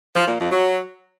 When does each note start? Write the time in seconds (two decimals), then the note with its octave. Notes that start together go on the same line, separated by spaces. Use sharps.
0.15 F3
0.27 A#2
0.39 F2
0.51 F#3